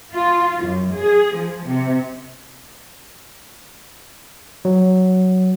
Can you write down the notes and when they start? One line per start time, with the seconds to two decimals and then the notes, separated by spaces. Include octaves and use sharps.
0.14 F4
0.65 F#2
0.97 G#4
1.36 F3
1.67 C3
4.65 F#3